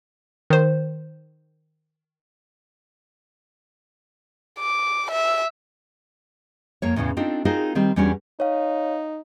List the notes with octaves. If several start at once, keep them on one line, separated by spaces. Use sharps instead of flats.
D#3 C5
D6
E5
F2 A#3 C#5
E2 A2 C#3 E3
C4 D4 D#4 F4 A4
C4 D#4 F4 F#4 G#4 A#4
D#3 G3 C4
E2 G3 C#4 D4 F#4
D#4 C#5 F5